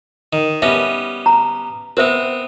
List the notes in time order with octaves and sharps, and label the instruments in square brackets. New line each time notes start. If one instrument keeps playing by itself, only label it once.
[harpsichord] D#3
[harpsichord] G3 B3 C#4 [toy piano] E5
[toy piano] A#5
[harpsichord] B3 C4 [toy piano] A#4 C5 E5